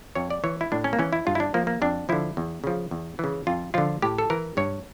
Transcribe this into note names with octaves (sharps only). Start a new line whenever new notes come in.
F2 C#5
D5
E3 C#5
E4
A2 D4
C#4
A#3
E3 C#4
E4
G2 F4
E4
D4
F3 A#3
A#3
F2 D4
D3 F3 E4
E2
C#3 F3
E2
C#3 E3
F2 F4
D3 F3 F4
A2 G4
A4
E3 A#4
G2 C#5